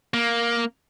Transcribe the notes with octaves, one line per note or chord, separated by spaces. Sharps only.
A#3